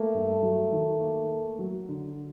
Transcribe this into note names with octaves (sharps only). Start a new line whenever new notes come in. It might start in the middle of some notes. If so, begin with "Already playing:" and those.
Already playing: A3 A#3
G2
F#3
D#3
A#3
A#3
F#3
D3